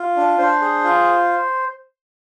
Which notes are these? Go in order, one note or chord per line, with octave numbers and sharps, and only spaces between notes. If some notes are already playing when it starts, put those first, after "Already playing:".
Already playing: F4
D4
D4 C5
G#4
F4